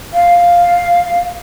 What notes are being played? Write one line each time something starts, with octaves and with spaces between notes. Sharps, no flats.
F5